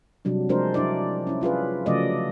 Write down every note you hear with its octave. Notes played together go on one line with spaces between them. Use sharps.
C3 F#3 G3 D4
F3 G#3 C4 D4 A#4 C5
F#3 D4 E4 D5
C#4 E4
C#4 F4 G#4 B4
C#3 F3 F#3 A3 D5 D#5